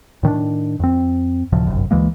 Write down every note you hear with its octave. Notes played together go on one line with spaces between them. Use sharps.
A2 D#3 C#4 D4
F2 C4
D2 A2 C3 F3
G1 C2 F#2
D2 E3 G#3 A#3